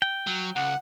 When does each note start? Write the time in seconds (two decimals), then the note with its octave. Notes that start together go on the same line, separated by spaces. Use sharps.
0.02 G5
0.27 F#3
0.56 C#2 F#5